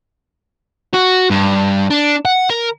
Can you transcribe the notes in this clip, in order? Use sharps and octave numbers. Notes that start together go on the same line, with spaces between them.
F#4
G2
D4
F#5
A#4